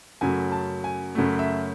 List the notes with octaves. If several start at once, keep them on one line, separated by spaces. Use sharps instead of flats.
F#2 C#3 F#3 A3 G#5
A5
G#5
F#2 C#3 F#3 A3
E5